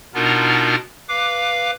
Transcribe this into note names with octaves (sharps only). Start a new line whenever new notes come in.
B2 B3 D4 D#4 F4 A#4
B4 F5 D6